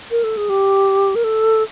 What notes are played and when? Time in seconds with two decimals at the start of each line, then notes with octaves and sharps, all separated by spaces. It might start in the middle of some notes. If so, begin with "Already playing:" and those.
0.11 A#4
0.24 A4
0.37 G#4
0.49 G4
1.15 A#4
1.24 A4